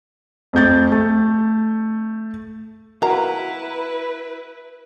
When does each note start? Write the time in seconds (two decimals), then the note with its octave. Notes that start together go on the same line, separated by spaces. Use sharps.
0.53 F2 A3 G6 A6
0.92 A3
3.02 E4 F#4 A#4 B4 F5 A#5